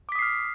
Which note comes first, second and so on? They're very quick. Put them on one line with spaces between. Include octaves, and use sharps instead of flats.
D6 B6 D#6 C7 F6